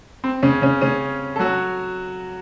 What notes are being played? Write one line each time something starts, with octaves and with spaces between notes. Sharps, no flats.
C4
C#3 C#4
C#3 C#4
C#3 C#4
A4
F#3 F#4